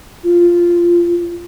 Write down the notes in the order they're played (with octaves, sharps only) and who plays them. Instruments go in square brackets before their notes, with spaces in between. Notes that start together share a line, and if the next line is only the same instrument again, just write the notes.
[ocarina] F4